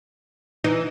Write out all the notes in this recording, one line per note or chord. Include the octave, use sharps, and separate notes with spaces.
E3 D#4